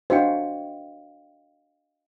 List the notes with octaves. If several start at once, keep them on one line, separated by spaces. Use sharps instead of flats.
D4 F#4 C5 D#5 F5 G5